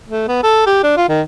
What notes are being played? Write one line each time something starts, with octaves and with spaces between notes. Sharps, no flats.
A3
B3
A4
G4
D4
F4
D#3